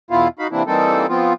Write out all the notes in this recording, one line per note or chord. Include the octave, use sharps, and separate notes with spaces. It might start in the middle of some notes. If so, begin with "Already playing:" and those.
E2 B2 B3 E4 F4 F5
D#4 F#4 F5 B5
C3 E3 A#3 C4 D4 E4
E3 G3 A#3 C4 D#4 A4
F3 B3 C4 F4